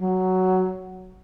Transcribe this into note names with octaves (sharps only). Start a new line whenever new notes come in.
F#3